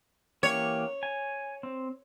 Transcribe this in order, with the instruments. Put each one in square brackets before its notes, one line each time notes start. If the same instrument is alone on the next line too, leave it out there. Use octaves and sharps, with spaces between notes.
[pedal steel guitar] E3 A#3 G4 [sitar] C#5
[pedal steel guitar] G#5
C4